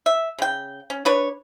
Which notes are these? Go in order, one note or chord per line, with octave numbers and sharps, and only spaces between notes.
E5
C#3 G5
C#4
D4 B4 C#5